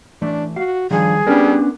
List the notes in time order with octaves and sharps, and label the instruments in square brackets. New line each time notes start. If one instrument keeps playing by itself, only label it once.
[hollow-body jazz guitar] E3 A3 [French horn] D4
[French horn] F#4 [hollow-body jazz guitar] F5
[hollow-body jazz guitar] D#3 G3 [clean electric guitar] F3 [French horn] D4 [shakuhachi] G#4
[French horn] G3 [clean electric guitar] B3 C#4 D4 [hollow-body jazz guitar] A#4 B4